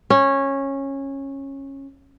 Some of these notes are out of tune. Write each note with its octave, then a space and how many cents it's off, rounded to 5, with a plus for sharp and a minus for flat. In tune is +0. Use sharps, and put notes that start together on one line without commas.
C#4 -15